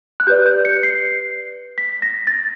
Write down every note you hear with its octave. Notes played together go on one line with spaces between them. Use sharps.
F#6
G4 B4 D5 G6
G6
C#7
C7
B6
A#6
A6